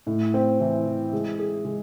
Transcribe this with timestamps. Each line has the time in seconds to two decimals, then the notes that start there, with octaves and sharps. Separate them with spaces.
0.07 A2
0.34 C4
0.60 E3
0.86 E3
1.13 G#3
1.39 G#4
1.65 G#3